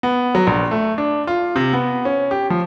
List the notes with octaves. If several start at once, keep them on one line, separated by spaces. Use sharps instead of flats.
B3
F#3
A#1
A3
D4
F4
C3
B3
C#4
G4
F3